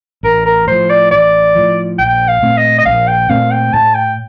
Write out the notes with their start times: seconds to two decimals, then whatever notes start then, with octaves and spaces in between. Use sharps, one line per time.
0.23 A1 A#4
0.46 A#4
0.67 A2 F3 C5
0.90 D5
1.11 A1 D5
1.55 A2 F3
1.99 A#1 G5
2.28 F5
2.42 A#2 A3 C4
2.57 D#5
2.78 D#5
2.85 A#1 F5
3.08 G5
3.29 A#2 A3 C4 F5
3.51 G5
3.73 A2 A5
3.95 G5